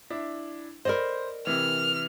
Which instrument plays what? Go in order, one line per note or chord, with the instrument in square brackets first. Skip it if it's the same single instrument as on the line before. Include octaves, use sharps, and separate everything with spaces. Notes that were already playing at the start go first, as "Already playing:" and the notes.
[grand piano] D4 E4
[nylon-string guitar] A#4 D5 D#5 [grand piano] C5 B5
[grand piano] C3 E3 [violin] F6